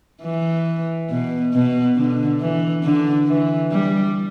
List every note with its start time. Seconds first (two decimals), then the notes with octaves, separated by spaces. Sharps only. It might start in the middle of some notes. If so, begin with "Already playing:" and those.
0.22 E3
1.10 B2
1.53 B2
1.96 D3
2.40 E3
2.83 D3
3.27 E3
3.71 G3